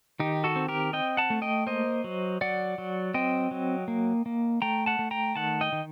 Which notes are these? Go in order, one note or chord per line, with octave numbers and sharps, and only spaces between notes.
D#3 D#4 G4
F#4 A4
C4
G4 A#4
C4 D#5 G5
F#5 A5
A3
D#5 G5
A#3 C5 D#5
F#3
F#3 D5 F#5
F#3
C4 D#5 G5
F#3
A#3
A#3
A3 G5 A#5
F#5 A5
A3
G5 A#5
D#3 F#5 A5
D#5 G5
D#3